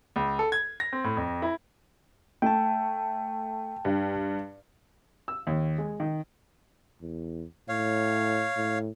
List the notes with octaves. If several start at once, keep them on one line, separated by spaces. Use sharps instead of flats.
C#2
A4
G#6
A#6
C4
A2
F2
E4
A3 G5 A5
G2
E6
D#2
G#3
D#3
E2
A2 C#5 F5
A2